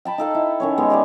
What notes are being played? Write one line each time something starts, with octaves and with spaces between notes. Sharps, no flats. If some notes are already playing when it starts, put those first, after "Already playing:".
G5 A5 B5
D#4 A4 F5
E4
D#3 C#4 C#5
G#3 B3 G4
G4 D5 G#5